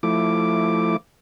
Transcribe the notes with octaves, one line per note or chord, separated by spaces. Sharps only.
F3 A3 E4 D6